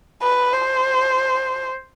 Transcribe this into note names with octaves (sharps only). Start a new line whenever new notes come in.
B4
C5